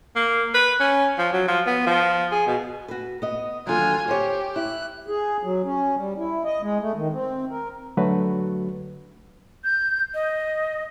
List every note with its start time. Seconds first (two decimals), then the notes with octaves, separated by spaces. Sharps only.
0.16 A#3
0.54 B4
0.80 C#4
1.18 F3
1.33 F#3
1.48 F3
1.67 B3
1.87 F3
2.31 G#4
2.47 B2
2.88 F#4 B4
3.22 B3 D#5
3.67 D#2 D3 F#3 F4 G#5
4.08 G4 C5 C#5
4.56 E4 F#6
5.08 G#4
5.43 F#3
5.65 C#4
5.98 G3
6.18 E4
6.44 D#5
6.61 G#3
6.81 A3
6.96 D#3
7.12 C4
7.51 A#4
7.97 D3 F#3 A3 F#4 B4
9.64 G6
10.14 D#5